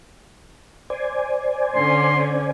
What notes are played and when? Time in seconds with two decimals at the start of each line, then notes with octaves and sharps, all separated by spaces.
0.90 C5 D5 G#5
1.75 D3 C#4 C6